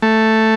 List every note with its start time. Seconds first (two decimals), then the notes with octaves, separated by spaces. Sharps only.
0.02 A3